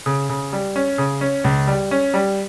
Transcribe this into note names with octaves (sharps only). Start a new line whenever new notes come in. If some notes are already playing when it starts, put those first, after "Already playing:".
C#3
C#3
G3
C#4
C#3
C#4
C#2
G3
C#4
G3